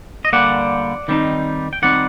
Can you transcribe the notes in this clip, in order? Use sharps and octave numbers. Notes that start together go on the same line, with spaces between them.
D#5
D3 G3 A#3 D5 F#5
D#3 G3 C4 D#4
G5
D#3 G3 C4 D#4 D5 F#5